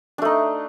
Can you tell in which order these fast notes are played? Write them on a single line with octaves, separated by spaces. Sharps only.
D4 A3 D#4